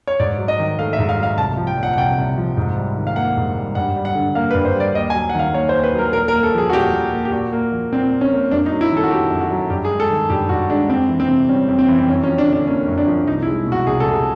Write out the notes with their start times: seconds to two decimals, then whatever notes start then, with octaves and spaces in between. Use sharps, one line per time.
0.07 C#5
0.20 G#2 D5
0.39 F#3
0.48 D#5
0.59 D#3
0.79 A3 F5
0.93 E5
0.99 G#2
1.09 F5
1.18 F#3
1.23 F5
1.38 C2 A5
1.57 F3
1.67 G5
1.78 A#2
1.83 F#5
1.93 F#5
1.97 C2 G5
2.18 C2
2.38 F3
2.57 G#2
2.77 G3
2.97 D#3
3.07 F5
3.16 A#3 F#5
3.37 G#2
3.56 G3
3.75 G2 F#5
3.96 G3
4.05 F#5
4.15 D3
4.35 A#3 F5
4.51 B4
4.55 G2
4.65 C5
4.75 G3 D5
4.95 D#2 D#5
5.10 G#5
5.14 F#3
5.29 F#5
5.35 D#3 F5
5.54 A#3 C#5
5.69 C5
5.74 D#2
5.83 B4
5.93 F#3
5.98 A#4
6.13 A#2 A#4
6.28 A#4
6.33 A#3
6.43 A4
6.54 F3 G#4
6.69 F#4
6.73 A#2 G4
6.92 A#2
7.12 A#3
7.25 G4
7.32 A#2 F#4
7.52 A#3
7.72 F3
7.92 A#2 C4
8.11 A#2
8.21 C#4
8.32 A#3
8.51 F#2 D4
8.66 D#4
8.72 F#3
8.81 E4
8.92 D#3 A4
9.04 F#4
9.11 A3 G4
9.31 F#2
9.41 F#4
9.51 F#3
9.70 G2 G4
9.85 G#4
9.91 G#3
10.00 A4
10.10 D#3
10.30 G2 G4
10.49 G2 F#4
10.70 G#3 D4
10.89 F2 C4
11.09 E3
11.20 C4
11.29 C3
11.49 G3 C#4
11.68 F2
11.79 C4
11.88 E3
11.99 C4
12.08 F#2 C#4
12.23 C#4
12.28 F3
12.38 D4
12.48 D3
12.53 D4
12.67 A#3 C#4
12.87 F#2
12.98 D4
13.07 F3
13.27 C2 D#4
13.43 E4
13.47 G#3
13.67 B2
13.72 F#4
13.87 C2 G#4
14.00 A4
14.06 C2
14.13 G#4